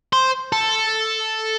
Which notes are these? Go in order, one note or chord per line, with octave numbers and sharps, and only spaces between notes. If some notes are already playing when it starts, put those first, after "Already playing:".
C5
A4